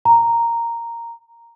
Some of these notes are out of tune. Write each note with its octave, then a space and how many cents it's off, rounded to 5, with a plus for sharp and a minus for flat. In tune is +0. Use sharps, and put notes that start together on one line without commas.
A#5 -5